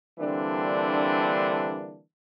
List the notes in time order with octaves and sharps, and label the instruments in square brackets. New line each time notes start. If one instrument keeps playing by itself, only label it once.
[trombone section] D3 E3 G3 A#3 C4 D4